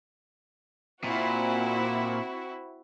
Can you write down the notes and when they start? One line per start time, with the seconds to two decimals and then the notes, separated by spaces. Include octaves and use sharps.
1.04 A#2 C4 E4 F#4